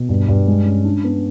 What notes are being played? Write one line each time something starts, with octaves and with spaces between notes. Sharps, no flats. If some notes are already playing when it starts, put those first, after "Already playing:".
Already playing: B2
G2
G2
G#3
C#4
D4
B3